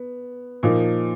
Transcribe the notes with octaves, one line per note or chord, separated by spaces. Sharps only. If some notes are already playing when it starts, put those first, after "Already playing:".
Already playing: B3
A#2 F3 A#3 D#4